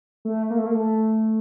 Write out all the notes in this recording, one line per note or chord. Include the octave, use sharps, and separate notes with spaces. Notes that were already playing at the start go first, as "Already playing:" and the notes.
A3
A#3
A3
A#3
A3